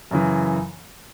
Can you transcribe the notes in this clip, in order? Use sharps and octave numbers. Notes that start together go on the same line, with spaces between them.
F#2 C#3 E3